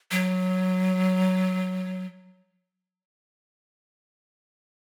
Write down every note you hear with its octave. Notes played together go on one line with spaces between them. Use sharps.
F#3